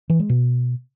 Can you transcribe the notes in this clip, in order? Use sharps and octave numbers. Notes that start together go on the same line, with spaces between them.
E3
G#3
B2